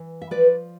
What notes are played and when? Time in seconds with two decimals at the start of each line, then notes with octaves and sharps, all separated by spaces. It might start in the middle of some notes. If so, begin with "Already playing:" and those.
Already playing: E3
0.22 E5
0.31 F3 B4 D5